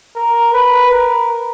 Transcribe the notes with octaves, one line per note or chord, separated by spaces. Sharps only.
A#4
B4
A#4